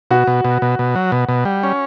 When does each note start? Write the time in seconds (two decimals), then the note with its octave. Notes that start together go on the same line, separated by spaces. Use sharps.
0.11 B2 F#4
0.27 B2
0.45 B2
0.62 B2
0.79 B2
0.95 F#3
1.12 B2
1.29 B2
1.45 G3
1.63 C#4